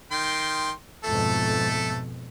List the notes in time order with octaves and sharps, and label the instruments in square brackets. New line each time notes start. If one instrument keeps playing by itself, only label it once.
[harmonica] D#3 G5 C6
[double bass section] F2 G#2 B2 [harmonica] A3 A4